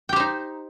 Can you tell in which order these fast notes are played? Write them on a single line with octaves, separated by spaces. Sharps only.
G5 G4 C5 D#4